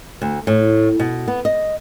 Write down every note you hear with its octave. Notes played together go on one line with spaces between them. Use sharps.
D2
A2
B2
B3
D#5